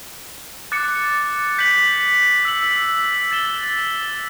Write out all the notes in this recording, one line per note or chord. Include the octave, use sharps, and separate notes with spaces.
D6 F#6 A6 C#7
G6 B6 F#7
E6 B6 F#7
A6 E7 G7